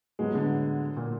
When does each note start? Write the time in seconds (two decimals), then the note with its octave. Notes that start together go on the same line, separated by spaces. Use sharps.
0.19 A2 F#3 G#3 B3
0.35 D3
0.97 A#2